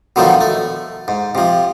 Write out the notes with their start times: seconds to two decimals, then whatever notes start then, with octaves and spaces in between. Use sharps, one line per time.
0.16 B2 D3 D#3 F3 F#3 A3
0.41 A3
1.08 G#2
1.35 C3 F3